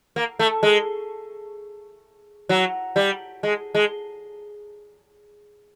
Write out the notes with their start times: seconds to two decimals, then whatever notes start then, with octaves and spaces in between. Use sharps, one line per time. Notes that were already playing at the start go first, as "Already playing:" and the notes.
0.16 A#3
0.39 A3
0.63 G#3
2.49 F#3
2.96 G3
3.43 G#3
3.75 G#3